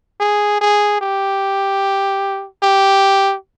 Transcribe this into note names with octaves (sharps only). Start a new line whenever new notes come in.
G#4
G#4
G4
G4